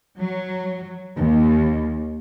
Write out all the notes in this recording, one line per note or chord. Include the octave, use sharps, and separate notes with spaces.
F#3
D#2